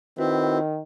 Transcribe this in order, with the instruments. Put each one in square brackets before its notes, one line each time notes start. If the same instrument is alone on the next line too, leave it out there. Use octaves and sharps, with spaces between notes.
[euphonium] D#3 [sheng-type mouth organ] C4 [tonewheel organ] E4 F#4 B4